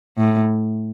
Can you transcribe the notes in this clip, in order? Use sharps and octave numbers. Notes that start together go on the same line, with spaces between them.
A2